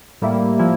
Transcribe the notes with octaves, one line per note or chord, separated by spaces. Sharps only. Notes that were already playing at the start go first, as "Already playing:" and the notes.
A2 G3 A#3 E4
F3 A#3 E4